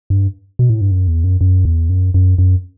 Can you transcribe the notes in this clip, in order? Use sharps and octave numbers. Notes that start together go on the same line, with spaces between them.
G2
B2
A2
G2
F#2
E2
F#2
F#2
E2
F#2
F#2
F#2